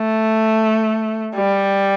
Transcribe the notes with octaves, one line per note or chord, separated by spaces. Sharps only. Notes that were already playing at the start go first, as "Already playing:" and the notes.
Already playing: A3
G3